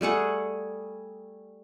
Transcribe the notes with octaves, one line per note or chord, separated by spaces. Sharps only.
G3 A3 G#4 F#5